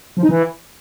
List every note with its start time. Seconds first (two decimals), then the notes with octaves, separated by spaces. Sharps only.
0.17 F3
0.23 D#4
0.29 E3